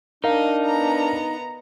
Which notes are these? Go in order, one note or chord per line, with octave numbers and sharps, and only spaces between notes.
D4 D#4 A#4 D#5 F5
B3 A#5